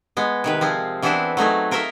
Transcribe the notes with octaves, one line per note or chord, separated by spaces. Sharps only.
G#3 B3
C3 D#3 B4
F3 C4 G#4
E3 B3 C4 D4 E4 C5
F#3 A3 D#4 G#4
F4 A#4 D#5 E5